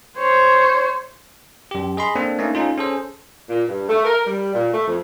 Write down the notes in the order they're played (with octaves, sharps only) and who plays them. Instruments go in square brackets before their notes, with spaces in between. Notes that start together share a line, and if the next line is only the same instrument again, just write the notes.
[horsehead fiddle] C5 C#5
[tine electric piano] F#2 G4
G#4 D#5 B5 C6
A#3 C4 D4 A4
A3 A#3 C#4 D#4
C#4 D#4 F4 A4
C#4 G#4 A4 C5
[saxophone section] A#2
G2
A3
A#4
G3
A#2
A3
F2